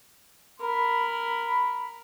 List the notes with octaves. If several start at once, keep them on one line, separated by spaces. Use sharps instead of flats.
A#4 B5